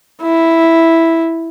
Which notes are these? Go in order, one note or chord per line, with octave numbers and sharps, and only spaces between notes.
E4